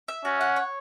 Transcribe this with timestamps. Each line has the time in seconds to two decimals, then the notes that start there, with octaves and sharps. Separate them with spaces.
0.08 E5
0.25 C#4 F#4
0.41 F#5
0.56 C#5